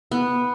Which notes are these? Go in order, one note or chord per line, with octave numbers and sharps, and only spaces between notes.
B3